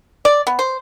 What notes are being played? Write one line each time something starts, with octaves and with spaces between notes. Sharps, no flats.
D5
B3
C5